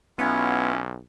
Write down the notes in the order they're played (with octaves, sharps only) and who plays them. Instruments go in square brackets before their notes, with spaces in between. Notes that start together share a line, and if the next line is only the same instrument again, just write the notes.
[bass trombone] B1 [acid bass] B3 [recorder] C#4 [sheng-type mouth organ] E4 F4